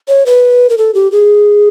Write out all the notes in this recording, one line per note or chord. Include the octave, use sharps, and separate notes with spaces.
C#5
B4
A#4
A4
G4
G#4